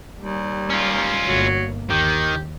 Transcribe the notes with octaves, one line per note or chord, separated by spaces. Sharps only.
D#2 G3
C#4 F4
G1 F#3 A#3
D#2 D#3 G4